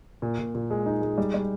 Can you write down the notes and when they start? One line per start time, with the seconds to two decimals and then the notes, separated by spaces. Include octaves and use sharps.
0.22 A#2
0.39 A#2
0.55 A#2
0.70 G#3
0.86 D#4
1.02 G#3
1.18 G3
1.34 G3